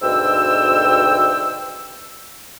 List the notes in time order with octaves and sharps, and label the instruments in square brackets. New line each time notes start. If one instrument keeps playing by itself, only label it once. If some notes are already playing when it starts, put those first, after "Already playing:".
[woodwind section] D2 G#2 B2 G5 E6